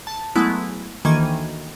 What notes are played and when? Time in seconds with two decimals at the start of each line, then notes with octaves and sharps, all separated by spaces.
0.07 A5
0.36 F#3 G#3 A3 B3 E4
1.05 D2 D#3 E3 A#3 G#6 D#7